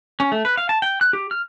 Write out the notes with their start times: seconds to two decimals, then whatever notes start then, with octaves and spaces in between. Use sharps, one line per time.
0.20 C#4
0.32 A3
0.45 B4
0.57 F5
0.69 A5
0.82 G5
1.01 F#6
1.13 G4
1.31 F6